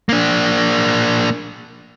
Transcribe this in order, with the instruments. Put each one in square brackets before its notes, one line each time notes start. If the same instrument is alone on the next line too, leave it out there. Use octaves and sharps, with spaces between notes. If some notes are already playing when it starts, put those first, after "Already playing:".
[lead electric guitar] A#3 D4